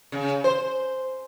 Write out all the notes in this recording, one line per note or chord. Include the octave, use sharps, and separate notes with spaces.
C#3
C5